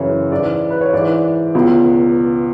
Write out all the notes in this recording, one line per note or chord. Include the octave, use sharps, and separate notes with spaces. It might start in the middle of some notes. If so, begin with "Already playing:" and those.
Already playing: F#2 C#3 E3 C#5
G#2 E3 D5
B4
C#5
G#2 E3 D5
C#2 B2